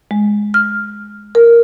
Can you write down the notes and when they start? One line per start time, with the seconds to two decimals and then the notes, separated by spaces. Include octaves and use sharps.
0.11 G#3
0.54 F6
1.35 A#4